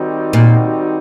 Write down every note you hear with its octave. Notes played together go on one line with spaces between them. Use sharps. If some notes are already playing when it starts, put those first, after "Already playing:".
Already playing: D#3 G3 C4 D#4 F#4
A#2